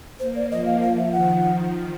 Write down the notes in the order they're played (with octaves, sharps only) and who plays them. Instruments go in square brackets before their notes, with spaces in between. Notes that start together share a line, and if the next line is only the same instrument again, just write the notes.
[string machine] A#3 [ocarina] C5
[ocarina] D5
[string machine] F3 [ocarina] D#5
[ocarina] F5
[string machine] F3 [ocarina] F5
[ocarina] E5
[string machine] D#3 [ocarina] F#5